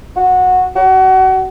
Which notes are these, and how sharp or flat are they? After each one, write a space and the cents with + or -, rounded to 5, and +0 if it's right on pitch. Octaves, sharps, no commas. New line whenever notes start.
F#4 -15
F#4 +30